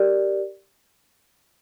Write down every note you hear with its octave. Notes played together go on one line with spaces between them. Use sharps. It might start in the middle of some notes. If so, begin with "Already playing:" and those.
Already playing: G4 A#4 D5